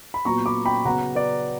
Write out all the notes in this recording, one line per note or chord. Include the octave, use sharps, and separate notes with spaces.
B5
A#2 F#3 B3 A#5 C#6
B5 D6
G5 B5
C#3 F#3 B3 F#5 A#5
B4 D5